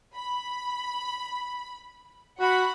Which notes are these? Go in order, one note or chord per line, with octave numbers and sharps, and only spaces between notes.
B5
F#4 F#5 B5